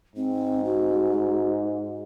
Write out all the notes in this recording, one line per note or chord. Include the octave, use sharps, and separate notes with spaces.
G#2 C4
F#4